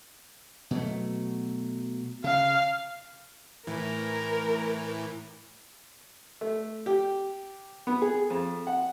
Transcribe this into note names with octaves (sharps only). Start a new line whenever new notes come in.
B2 F#3 A3
C#3 F5
A2 E3 A#4
A3
G4
B3
G#4
F2
F#5